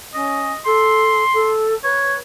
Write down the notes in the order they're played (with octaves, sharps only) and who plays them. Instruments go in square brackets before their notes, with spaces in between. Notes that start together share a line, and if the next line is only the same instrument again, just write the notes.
[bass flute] C#4 [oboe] D#5
[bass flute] A4 [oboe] C6
[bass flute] A4
[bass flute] B4 [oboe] C#5